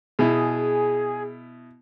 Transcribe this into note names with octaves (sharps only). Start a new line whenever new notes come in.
B2 E4 G#4